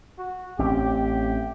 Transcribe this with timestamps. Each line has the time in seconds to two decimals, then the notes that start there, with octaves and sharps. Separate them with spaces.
0.18 F#4
0.59 A1 C4 C#4 G4